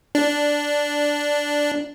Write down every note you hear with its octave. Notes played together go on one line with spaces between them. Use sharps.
D4